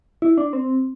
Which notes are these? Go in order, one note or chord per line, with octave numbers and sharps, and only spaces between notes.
E4
D4
C4